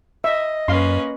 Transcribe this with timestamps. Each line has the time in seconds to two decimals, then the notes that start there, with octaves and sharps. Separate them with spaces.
0.24 D#5 E5
0.68 F#2 A#3 C#4 B4 F5 C6